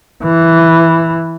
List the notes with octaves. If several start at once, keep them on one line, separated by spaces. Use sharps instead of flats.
E3